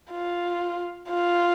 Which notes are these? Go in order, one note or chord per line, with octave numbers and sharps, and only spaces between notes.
F4
F4